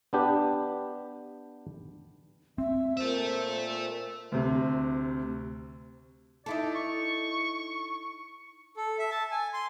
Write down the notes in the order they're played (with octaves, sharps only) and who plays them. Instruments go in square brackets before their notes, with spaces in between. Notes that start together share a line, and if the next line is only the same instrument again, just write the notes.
[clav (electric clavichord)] B3 D4 G4
[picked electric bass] C4 [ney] E5
[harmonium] A#2 [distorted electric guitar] A4 E5 [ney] C5
[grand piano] D2 C3
[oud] D#4 E4 A4 [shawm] D5
[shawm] C#6
[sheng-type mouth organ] A4
E5
A5
G#5
C6